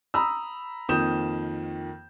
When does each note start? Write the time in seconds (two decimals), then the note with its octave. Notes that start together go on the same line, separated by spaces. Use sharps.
0.14 A#5 B5 D#6 E6
0.89 F2 D#3 A#3 D#6 G6 E7